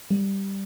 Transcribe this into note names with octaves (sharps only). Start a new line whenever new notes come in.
G3